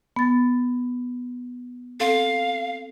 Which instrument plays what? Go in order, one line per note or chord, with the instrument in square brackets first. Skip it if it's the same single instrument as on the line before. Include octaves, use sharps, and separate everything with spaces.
[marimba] B3 A6
[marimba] C4 A4 [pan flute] F5